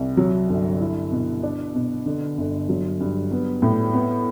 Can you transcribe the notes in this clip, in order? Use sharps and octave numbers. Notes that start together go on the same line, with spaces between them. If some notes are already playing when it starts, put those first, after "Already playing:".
Already playing: C2
F#3
G1
E4
B2
D4
B2
D3
G1
F#3
G2
B3
A2
B3